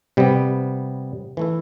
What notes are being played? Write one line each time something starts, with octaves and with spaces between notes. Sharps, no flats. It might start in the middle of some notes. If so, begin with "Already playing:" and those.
C3 G3 B3
E3 A3 E4